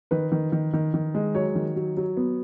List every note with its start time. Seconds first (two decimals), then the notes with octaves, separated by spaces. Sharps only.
0.11 D#3 B4
0.32 D#3
0.52 D#3
0.73 D#3
0.94 D#3
1.15 G#3
1.35 F#3 C#5
1.55 D#3
1.76 F#3
1.97 F#3
2.17 B3